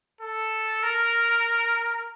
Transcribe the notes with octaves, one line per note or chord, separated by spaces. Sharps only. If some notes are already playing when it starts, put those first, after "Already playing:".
A4
A#4